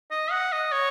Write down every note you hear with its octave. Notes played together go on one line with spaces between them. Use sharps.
D#5
F#5
D#5
C#5